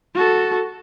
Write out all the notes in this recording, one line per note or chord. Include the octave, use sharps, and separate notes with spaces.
F#4 A4